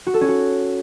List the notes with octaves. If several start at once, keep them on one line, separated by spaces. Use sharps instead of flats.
F#4
A4
C#4
F#4